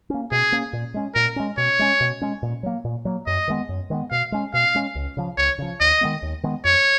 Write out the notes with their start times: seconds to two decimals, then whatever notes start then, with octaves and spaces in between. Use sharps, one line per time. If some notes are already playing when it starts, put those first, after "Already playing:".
0.10 A#3 C#4
0.32 B2 G#4
0.52 A#3 C#4
0.73 A#2
0.94 G#3 C#4
1.15 A#2 A#4
1.36 G#3 C#4
1.57 B2 C#5
1.79 G#3 C#4
2.01 B2
2.22 G#3 C#4
2.43 A#2
2.63 F#3 A#3
2.85 A#2
3.05 F#3 A#3
3.27 F#2 D#5
3.48 D#3 G#3 B3
3.69 F#2
3.90 D#3 G#3 B3
4.11 B2 F5
4.32 G#3 C#4
4.54 B2 F5
4.75 G#3 C#4
4.95 C#2
5.17 C#3 F3
5.38 C#2 C#5
5.59 C#3 F3
5.80 D#2 D#5
6.01 D#3 G#3 B3
6.22 D#2
6.43 D#3 G#3 B3
6.64 F2 C#5